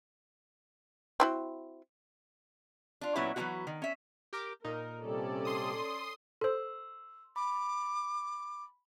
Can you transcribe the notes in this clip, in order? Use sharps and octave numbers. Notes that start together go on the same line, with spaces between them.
C4 E4 F#4
D4 F4
A#2 F#3 B3 C#4 E4 C#5
E3 F#3 B3 C#4 E4 F#4
D#3
C#4 E5
G4 A#4 D6
A#2 D#4 A#4
C3 G3 C#4 A4 D5
C6 D#6
A4 C5 C6 E6
B5 D6